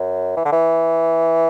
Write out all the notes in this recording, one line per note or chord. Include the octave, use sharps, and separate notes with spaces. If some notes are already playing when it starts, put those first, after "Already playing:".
Already playing: F#2
E3
D3
E3